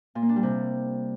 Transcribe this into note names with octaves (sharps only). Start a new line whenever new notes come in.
A#2
A#3
D4
G3
C3